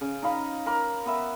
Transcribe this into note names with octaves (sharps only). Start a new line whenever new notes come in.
C#3
D#4 D#5 F5 B5
A#4 B5 D6
B3 B4 E5